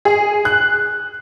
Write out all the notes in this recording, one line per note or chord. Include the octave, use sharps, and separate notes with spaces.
G#4
F#6